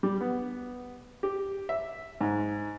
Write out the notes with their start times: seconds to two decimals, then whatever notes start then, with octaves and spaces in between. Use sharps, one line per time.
0.03 G3
0.21 B3
1.23 G4
1.69 E5
2.21 G#2